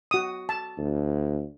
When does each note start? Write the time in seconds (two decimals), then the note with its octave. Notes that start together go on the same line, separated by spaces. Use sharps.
0.11 F#4 D#6
0.49 A5
0.78 D2